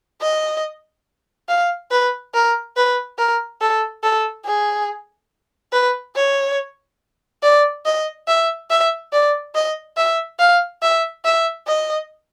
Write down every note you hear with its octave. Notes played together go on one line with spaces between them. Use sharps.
D#5
F5
B4
A#4
B4
A#4
A4
A4
G#4
B4
C#5
D5
D#5
E5
E5
D5
D#5
E5
F5
E5
E5
D#5